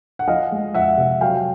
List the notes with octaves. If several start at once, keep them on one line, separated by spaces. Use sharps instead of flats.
F#5
F3 D#5 F5
G#3
F2 E5 F#5
C3
F#3 F5 G5